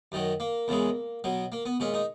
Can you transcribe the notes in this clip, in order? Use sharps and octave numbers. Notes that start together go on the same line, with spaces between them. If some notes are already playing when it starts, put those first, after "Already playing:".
F#2 D#3 F#3
A#3
E2 C#3 E3 G#3
B2 F#3
A#3
B3
A#2 G#3 C#4
D#4